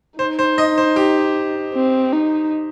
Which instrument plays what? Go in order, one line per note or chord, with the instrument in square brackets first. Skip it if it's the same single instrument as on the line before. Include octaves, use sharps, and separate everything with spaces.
[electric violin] D#4 [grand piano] C5
[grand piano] C5
D#5
C5
G4
[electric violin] C4
D#4